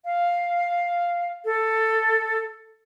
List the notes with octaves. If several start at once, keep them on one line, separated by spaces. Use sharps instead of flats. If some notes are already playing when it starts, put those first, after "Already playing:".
F5
A4